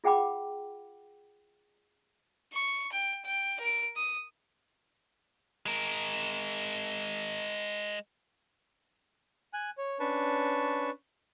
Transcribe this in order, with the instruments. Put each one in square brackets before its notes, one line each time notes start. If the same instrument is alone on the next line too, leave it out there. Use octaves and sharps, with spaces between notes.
[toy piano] F4 G#4 F#5 G5 B5 D6
[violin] C#6
G5
G5
A#4 D7
D#6
[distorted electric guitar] G#3 A#4
[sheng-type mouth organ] G#5 F#6
C#5
C#4 D4 B4 A5 C#6